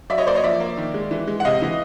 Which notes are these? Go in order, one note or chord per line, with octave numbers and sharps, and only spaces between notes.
F#3 D5 E5
C#5 D#5
A#3 C5 D5
C#5 D#5
F3 D5 E5
A#3
D#3
G#3
E3
G#3
F#5
C3 D#5 F5
E3